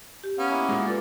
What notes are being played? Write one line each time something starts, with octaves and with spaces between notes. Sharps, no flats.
G4
B3 C#4 F5
A#3 B3 E4
A#2 G#3
F4 A4 B4 D5